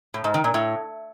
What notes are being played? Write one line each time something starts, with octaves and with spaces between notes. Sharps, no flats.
A2
G#2
D#3
A#2
A2